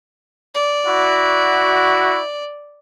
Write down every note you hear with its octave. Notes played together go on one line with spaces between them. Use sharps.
D5
E4 F#4